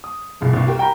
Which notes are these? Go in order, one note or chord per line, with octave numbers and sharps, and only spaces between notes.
D#6
C2 C#3 F3
C2 G2
F#4 G4 A#4
G5 A#5 B5